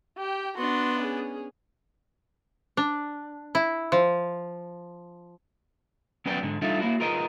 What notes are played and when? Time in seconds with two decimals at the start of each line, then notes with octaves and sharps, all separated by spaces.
0.18 G4 G5
0.57 B3 D4 F#4 C6
0.99 C#4 G#4
2.77 D4
3.55 E4
3.92 F3
6.26 F#3 B3 C#4 B4 D5 G5
6.43 G#2 D3
6.62 G3 D4 D#4 F4 A4 E5
6.80 A#3 E4 F#4
7.00 F4 G#4 A#4 B4 D#5